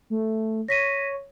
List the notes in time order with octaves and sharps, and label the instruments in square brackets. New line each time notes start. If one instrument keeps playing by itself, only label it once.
[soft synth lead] A3
[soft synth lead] C#5 [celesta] A#6 B6 D#7